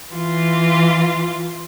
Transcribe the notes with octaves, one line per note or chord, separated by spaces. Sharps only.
E3 F4